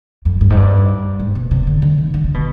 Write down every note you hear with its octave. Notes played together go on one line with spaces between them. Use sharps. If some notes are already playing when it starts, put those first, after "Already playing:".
F2
G2
G#2
G2
G#2
B2
C3
D3
D3
D#3
D3
D3
B2